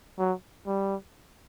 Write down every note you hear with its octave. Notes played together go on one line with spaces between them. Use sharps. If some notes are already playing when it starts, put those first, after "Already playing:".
F#3
G3